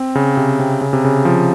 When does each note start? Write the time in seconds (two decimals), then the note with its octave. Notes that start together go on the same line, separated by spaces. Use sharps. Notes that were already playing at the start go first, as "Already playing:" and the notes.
Already playing: C4
0.15 C#3
0.37 C3
0.60 C3
0.81 C#3
0.93 C3
1.05 C#3
1.25 F3